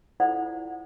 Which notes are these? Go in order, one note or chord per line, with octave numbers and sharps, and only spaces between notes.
E4 F4 A4 C5 D5 F#5